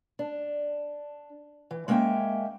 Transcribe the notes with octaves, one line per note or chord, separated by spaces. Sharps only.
D4
E3
G#3 A#3 C#4 C5 E5 G5